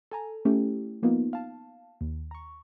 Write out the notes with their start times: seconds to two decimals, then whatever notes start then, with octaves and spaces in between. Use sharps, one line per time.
0.11 A4 G#5 A#5
0.45 A3 C#4 E4 G4 A4
1.02 F3 A#3 B3 D#4 F4
1.33 F5 A5
2.01 D#2
2.31 A#5 C#6